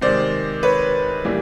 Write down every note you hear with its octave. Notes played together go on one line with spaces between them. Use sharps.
C3 D#3 G#3 C5 D5
B4 C#5
A2 E3 G3 A#3